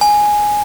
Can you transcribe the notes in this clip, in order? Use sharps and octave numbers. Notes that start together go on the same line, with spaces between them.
G#5